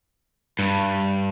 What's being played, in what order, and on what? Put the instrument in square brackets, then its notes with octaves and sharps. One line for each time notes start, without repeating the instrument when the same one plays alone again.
[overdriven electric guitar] G2